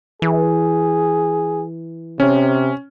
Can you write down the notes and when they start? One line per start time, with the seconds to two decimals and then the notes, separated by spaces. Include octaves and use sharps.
0.22 E3 G#4
2.20 C3 C#4